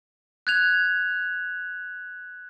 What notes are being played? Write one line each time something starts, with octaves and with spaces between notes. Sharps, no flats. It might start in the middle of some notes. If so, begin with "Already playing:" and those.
F#6 G#6 F7